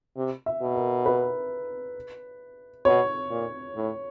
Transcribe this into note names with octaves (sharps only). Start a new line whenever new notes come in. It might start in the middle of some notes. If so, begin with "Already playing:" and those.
C3
E5
B2
A#4
B4
B2 C#5
A#2
A2